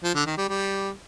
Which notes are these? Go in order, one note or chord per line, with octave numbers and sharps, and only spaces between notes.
F3
D3
D#3
G3
G3